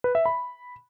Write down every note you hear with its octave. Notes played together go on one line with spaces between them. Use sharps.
B4
E5
B5